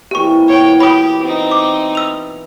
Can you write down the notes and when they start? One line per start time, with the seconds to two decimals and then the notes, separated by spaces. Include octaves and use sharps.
0.11 A#2 E3 C4 G4 C#6
0.48 B2 E4 C#5 G5
0.80 G4 B5 D#6
1.23 C4 D#4 B4
1.51 D6
1.95 E6 F7